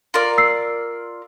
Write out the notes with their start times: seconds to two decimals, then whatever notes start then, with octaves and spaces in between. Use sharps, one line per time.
0.14 F4 A#4 D5
0.38 E6 C7